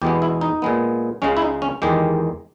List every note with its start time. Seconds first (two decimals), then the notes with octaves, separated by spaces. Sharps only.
0.02 E2 B2 G#3 B3 G4
0.22 E4
0.41 D#4
0.62 A#2 G#3 B3
1.22 C#2 C#3 G#3 C#4
1.37 E4
1.42 D#4
1.62 C#4
1.82 E2 D#3 G#3 G4